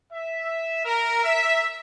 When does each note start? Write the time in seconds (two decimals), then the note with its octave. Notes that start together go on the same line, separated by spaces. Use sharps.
0.12 E5
0.85 A#4
1.24 E5